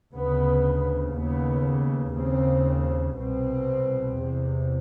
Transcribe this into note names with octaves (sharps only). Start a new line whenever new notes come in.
D2 C#3 B3
D#2 C#3 B3
D#2 C#3 C4
C2 B2 C4
E2 C3